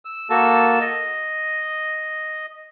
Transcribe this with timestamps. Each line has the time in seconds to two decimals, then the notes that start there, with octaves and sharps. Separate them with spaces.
0.05 E6
0.30 A#3 F#4 A4 A5 E6
0.80 D#5